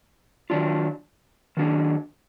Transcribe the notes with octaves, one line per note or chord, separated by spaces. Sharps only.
D#3 F#3 D4 F4
D#3 F#3 D4 G#4